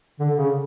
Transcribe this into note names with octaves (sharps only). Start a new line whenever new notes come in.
D3
C#3